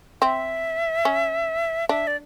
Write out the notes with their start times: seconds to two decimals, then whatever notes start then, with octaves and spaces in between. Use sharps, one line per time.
0.22 C4 E5
1.05 C#4
1.89 D4 E5
2.07 D5